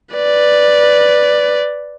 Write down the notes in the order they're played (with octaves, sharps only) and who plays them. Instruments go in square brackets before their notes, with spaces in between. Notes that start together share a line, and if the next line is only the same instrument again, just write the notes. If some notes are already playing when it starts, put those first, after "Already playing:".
[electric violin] B4 D5